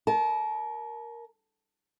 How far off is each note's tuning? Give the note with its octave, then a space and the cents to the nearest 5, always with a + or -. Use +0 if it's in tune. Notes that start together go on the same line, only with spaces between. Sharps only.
A#4 +5 A5 -35